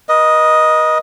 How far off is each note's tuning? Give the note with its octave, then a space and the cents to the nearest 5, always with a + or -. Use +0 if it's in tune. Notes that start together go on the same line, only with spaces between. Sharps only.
B4 -45 D#5 +0